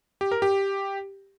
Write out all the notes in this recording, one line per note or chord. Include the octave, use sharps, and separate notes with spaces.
G4
A#4
G4